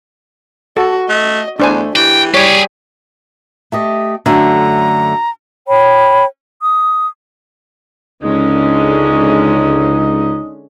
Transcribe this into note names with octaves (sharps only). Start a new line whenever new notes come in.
F#4 A4
A3 D#5
E2 A3 D4 C5 G#5
E3 G4 G5
G3 G4 G#4 C#5
A3 G4 D#5
F#2 D3 A3 A#5
C#5 G5 B5
D#6
C#2 D3 G#3 C#4 D#4 D#5